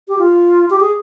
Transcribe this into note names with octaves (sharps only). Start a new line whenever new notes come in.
G4
F4
G4
G#4